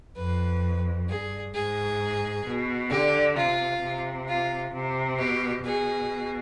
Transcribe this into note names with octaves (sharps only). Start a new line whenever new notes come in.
F2 B4
G2 G#4
G#2 G#4
B2
D3 G4
C3 F4
C3
F4
C3
B2 G4
B2 G#4